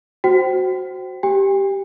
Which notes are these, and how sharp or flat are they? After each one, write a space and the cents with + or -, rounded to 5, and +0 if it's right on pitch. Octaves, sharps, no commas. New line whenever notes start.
F#4 +0 C5 +0 G5 -25
G4 -5 G5 +45